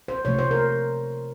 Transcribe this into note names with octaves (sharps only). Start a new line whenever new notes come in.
C5
C3 F3 A3 C#5
C5
A#4